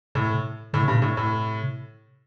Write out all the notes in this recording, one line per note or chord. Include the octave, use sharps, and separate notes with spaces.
A2 C3
A2 D3
C3
G2
A#2
A2 C3
A2